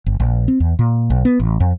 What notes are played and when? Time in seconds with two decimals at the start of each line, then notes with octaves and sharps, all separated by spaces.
0.06 G1
0.20 A#1
0.48 C4
0.60 E2
0.79 A#2
1.10 B1
1.25 B3
1.40 A1
1.60 F2